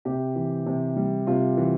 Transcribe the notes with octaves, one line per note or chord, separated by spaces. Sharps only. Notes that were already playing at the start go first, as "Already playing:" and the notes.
C3 G4
E3
C3
G3
C3 F4
E3